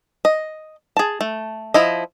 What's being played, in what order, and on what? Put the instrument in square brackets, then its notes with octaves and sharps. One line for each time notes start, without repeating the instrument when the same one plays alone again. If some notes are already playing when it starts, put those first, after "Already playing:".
[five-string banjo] D#5
G#4 A5
A3
F3 E4 D#5